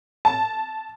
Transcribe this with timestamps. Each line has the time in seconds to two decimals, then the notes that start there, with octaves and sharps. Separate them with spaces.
0.25 A5